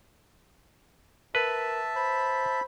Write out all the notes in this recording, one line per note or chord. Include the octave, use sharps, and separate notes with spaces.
A#4 B4 E5 A5
C5 B5